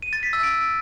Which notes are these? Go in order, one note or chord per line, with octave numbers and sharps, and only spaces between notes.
D#7
A6
B6
E6
D7